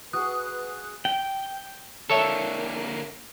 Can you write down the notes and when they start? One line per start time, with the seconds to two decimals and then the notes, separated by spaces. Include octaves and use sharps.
0.13 F#4 G#4 B4 D#6 F#6
1.05 G5
2.10 D3 A#3 A4 C#5 E5